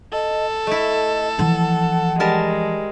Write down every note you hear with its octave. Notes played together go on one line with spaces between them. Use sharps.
A4 D#5
A3 E4 D#5
E3 F3 F#5
G3 G#3 A#4 A5